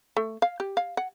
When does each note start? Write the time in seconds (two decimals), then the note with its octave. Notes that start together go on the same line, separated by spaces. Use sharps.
0.17 A3
0.42 F5
0.60 G4
0.77 F5
0.97 F#5